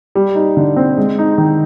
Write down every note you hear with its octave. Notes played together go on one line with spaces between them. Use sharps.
G3
D#4
D3
C4
G#3
D#4
D#3